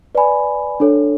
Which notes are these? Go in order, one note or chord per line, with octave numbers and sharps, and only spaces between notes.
B4 D5 G#5 B5
D4 A4 C#5